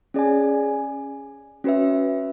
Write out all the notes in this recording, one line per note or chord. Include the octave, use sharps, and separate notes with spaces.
C#4 G#4 D5 G#5
C#4 F#4 B4 E5